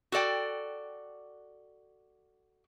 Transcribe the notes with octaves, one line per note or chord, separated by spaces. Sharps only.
F#4 A4 D5 G5